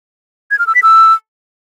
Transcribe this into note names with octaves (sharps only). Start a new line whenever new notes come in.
G#6
F6
E6
B6
E6